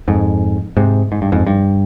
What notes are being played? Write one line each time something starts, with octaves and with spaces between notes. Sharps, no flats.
F2 G#2
G#2 C3
G#2
G2
F2 G#2
G2